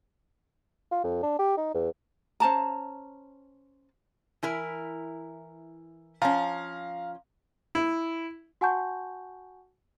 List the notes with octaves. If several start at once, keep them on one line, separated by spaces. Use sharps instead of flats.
F4
F2
D4
G4
D#4
E2
C#4 C5 A5 A#5
E3 E4 A#4
F3 C#4 F5 A#5
E4
F#4 F#5 G#5 A5 C#6 G6